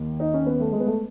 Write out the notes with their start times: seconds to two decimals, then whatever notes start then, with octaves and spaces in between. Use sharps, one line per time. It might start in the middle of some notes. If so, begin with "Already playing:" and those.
Already playing: D#2 D#3
0.20 D#4
0.34 C#4
0.46 B3
0.60 A3
0.72 G#3
0.80 B3
0.86 A3